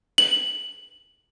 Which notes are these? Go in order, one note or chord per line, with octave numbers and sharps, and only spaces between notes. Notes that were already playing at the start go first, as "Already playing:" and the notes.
F#7